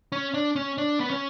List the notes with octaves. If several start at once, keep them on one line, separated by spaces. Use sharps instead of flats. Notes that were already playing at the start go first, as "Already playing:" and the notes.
C#4
D4
C#4
D4
B3
C#4